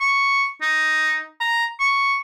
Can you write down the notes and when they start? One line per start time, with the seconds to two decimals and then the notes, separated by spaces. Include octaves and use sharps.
0.01 C#6
0.62 D#4
1.40 A#5
1.80 C#6